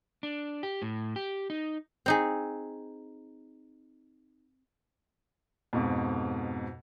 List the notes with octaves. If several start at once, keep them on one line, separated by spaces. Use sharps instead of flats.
D4
G4
A2
G4
D#4
C4 D#4 G#4
F2 G#2 B2